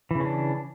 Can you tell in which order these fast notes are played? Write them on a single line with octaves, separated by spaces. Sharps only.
E3 C#3 C#4 D4